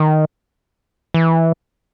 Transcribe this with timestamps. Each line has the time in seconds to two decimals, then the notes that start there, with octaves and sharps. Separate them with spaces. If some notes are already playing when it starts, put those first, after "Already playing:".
Already playing: D#3
1.14 E3